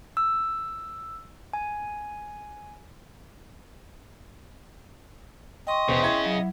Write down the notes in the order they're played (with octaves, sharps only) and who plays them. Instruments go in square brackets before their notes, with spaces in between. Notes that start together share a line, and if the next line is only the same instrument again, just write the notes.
[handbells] E6
G#5
[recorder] D#5 [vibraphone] G5 C6 C#6
[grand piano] E1 B3 C5 [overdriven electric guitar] C#3
[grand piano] E4 G#6
[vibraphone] F#3